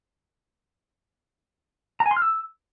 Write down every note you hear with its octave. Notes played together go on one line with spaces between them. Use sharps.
A#5
G#5
C6
F6
E6